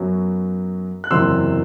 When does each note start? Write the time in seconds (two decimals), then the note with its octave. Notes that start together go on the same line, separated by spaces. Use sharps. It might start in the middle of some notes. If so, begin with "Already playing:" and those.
Already playing: F#2 F#3 B3
1.04 F#6
1.11 F#1 E2 C3 F#3 C6 E6